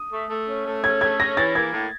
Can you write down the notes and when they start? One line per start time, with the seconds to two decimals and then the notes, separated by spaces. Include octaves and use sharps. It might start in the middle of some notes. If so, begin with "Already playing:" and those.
Already playing: D#6
0.11 A3
0.30 A3
0.48 C#4
0.66 A3
0.83 C#4 G#6
1.01 A3 G#6
1.19 C#4 A#6
1.36 E3 A6
1.54 A#3 G#6
1.73 A2